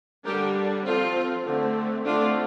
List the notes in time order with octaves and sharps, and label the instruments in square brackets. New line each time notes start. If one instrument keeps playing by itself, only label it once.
[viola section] D3 G3 D4 G4 A#4
F3 C4 F4 A4
D3 A3 C4
D3 A3 C4 D4 F4